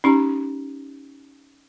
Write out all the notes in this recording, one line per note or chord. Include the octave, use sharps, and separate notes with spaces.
C#4 D#4 G4 A#5